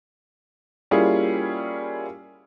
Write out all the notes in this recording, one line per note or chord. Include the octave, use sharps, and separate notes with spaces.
G3 A#3 C#4 E4 F4 G#4